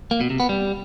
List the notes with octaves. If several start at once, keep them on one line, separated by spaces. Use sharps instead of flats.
A#3
B2
C3
B3
G3